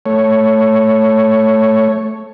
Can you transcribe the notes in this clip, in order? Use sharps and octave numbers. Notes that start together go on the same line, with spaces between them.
A3 C#5